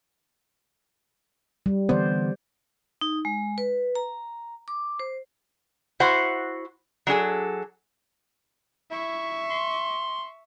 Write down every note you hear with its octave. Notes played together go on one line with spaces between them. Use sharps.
G3
D3 E3 B3 C5 D5
D#4
G#3
B4
A#5
D6
C5
E4 F#4 C5 F#5
F#3 D4 G#4 A4
E4 E5 C#6
C6